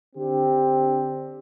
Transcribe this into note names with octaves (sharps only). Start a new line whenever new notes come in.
D3 C4 D4 G4